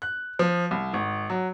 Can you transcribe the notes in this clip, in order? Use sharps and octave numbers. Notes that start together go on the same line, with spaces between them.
F#6
F3
C2
G#1
F#3